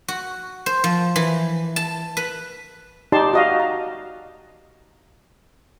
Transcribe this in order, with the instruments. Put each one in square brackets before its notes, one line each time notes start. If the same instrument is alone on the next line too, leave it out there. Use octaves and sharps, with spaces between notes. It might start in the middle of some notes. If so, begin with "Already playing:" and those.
[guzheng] F#4
C5
F3
E3
A5
B4
[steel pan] D#4 G4 D5 A5 C6
F#4 D#5 F5
A#5